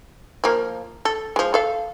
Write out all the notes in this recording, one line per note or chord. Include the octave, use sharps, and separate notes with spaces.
F3 A#3
A4
F3 G#3
A4 F5